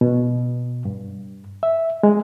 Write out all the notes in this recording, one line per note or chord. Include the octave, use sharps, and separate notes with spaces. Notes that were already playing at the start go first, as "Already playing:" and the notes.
B2
G2
E5
G#3